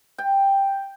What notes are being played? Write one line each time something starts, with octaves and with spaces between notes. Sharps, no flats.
G5